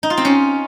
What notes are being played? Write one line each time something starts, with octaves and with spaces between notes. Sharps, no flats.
D#4
F4
C4
C#4